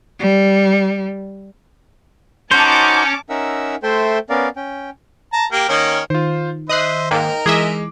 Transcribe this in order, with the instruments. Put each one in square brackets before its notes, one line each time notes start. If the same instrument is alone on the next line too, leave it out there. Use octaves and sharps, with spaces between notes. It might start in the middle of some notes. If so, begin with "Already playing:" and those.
[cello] G3
[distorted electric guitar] C#4 [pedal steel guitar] D#4 F#4 C5 [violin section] A5 D6 [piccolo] G6
[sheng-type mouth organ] C#4 D#4 A#4 E5 F#5 E6
A3 A4 C5 E5 G5 C6
B3 C#4 A#4 D5 F5
C#4 G5
[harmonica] A5 A#5
A#3 G4
D#3 A#3 C#4
[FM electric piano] D#3 [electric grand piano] F4 C5
[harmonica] C5 E5 [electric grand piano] D#5 [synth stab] D#6 F#6 C7
[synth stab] G#2 A#3 [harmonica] D#4 A#4 [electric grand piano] G5
[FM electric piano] E3 [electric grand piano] G#3 D6 [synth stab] G#4 D#5 E5